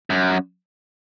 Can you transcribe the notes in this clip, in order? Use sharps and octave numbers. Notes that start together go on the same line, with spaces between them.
F#2